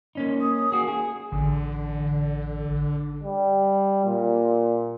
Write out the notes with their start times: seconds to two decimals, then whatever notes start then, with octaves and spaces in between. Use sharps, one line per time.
0.15 A#3 C#4 D#4
0.41 D#6
0.72 A#3 F#4 G#4
0.88 G#4 G#5
1.32 A1 D3
3.23 G3
4.06 A#2